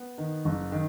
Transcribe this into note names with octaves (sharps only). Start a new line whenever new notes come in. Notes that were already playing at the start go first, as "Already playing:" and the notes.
Already playing: B3
D#3
F#1
D#3